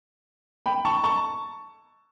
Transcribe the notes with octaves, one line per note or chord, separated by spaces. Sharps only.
G5 B5
A5 C#6
A5 C#6